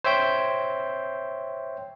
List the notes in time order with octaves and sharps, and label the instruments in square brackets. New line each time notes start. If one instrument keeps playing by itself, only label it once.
[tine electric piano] C5 C#5 E5 G5 G6